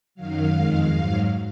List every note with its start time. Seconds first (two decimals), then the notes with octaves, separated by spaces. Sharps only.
0.15 F#2 D#3 F#3 F5
0.52 F2 D#3 G#3
0.88 G#2 F#3